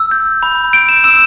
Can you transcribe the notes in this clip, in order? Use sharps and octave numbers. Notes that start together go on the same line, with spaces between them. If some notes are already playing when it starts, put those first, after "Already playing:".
Already playing: E6
G6
B5
G6 D7
E7
E6 E7